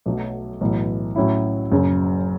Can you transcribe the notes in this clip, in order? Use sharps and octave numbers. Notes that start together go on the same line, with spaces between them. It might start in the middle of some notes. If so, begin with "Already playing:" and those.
B1 B2 F#3 A3
B1 A2 E3
A2 F#3 C#4 E4
F#1 F#2 C#3